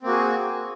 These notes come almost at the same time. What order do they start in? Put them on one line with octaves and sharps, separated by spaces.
C4 A#3 F#4 G#4